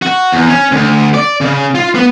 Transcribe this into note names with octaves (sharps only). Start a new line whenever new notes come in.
F#4
E2
C#4
D2
D5
C#3
F4
B3